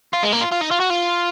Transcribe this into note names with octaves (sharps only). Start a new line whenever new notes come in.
F4
G#3
A#3
F4
F4
D#4
F4
F#4
F4